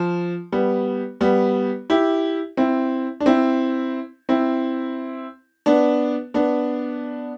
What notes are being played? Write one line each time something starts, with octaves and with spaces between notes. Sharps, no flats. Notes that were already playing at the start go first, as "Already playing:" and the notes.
Already playing: F3
G3 B3
G3 B3
E4 G4
C4 E4
D4
C4 E4
C4 E4
B3 D4
B3 D4